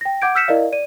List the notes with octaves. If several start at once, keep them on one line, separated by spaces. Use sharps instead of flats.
G5 A#6
F#5 D6 G6 G#6 D7
E6 F6 G6 B6 C#7 E7
E4 A#4 D5 D#5 F5
D5 D#7